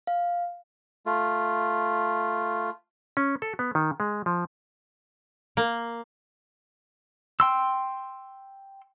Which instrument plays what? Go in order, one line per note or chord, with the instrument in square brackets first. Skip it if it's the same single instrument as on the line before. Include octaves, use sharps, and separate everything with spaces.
[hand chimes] F5
[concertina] A3 F4
[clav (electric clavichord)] C#4
A4
B3
D#3
G#3
F3
[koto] A#3
[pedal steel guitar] G5 C6 E6